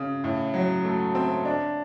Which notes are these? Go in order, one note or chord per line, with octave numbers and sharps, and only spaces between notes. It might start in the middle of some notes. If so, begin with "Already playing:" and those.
Already playing: C#3
A2
F#3
A3
C4
D4